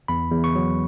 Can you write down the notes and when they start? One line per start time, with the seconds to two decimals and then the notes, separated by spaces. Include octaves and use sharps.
0.08 E2 B5
0.31 E2
0.44 C#6
0.55 F#3